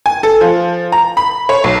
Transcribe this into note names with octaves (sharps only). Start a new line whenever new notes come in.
G#5
A4
F3
A#5
B5
C#5
B1